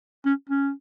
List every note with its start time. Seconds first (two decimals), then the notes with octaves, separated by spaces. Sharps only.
0.26 C#4
0.49 C#4